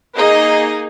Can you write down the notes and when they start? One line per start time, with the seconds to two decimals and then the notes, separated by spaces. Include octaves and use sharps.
0.17 A#3 D#4 G#4 D#5